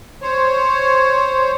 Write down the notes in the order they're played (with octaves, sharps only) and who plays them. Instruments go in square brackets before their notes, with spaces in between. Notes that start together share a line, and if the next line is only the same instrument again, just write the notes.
[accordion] C5 C#5